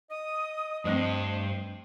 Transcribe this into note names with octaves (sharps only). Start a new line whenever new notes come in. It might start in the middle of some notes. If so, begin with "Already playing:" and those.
D#5 D#6
G2 F3 A3 C4 C5